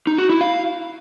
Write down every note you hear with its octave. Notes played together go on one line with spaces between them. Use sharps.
D#4
F#4
E4
F5